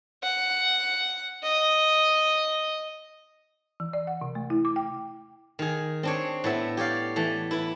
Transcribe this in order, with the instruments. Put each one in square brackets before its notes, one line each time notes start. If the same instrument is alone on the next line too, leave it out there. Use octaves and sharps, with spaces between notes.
[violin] F#5
D#5
[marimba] E3
D5
F#5
C3
A3
E4
D6
G5
[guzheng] D#3 G#4
C4 D4 C#5
A2 B3 E5
G4 C#5 D5 F5
E3 A3
E4 B4